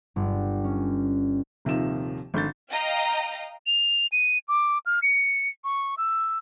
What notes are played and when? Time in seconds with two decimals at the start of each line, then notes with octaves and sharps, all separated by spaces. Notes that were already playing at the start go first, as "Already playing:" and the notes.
0.16 G1
0.64 C#4
1.65 D#1 C3 D#3 F3 E7
2.34 G#1 D3 G6 A6
2.71 D#5 F5 G5 A#5
3.66 F7
4.12 D#7
4.48 D6
4.86 F6
5.02 C#7
5.64 C#6
5.97 E6